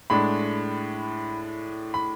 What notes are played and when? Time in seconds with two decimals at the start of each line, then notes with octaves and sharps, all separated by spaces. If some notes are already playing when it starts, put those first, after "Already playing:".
0.10 A2 G#3 D4 B5
1.94 B5